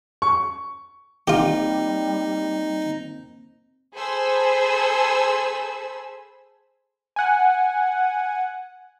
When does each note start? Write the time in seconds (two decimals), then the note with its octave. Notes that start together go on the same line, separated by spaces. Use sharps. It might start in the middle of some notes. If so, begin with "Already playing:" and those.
0.22 C#6
1.28 G3 A#3 C4 D#4 F4 G4
3.94 G#4 A4 C5 G#5 B5 E6
7.16 F#5 G#5